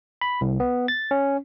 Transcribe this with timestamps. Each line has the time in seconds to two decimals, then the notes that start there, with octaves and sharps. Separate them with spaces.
0.21 B5
0.41 C2
0.60 B3
0.88 A6
1.11 C#4